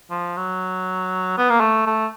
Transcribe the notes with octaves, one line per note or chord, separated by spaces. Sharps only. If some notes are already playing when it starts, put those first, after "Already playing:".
F3
F#3
B3
A#3
A3
A3